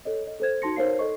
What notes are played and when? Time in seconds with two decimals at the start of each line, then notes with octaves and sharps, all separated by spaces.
0.05 A4 C#5 D#5
0.27 D#5
0.40 A4 C5 G#6
0.62 D#4 F#4 A5 C6 A#6 C#7
0.76 D#4 A#4 C5 C#5 F5 C7
0.99 A4 D#5 C#6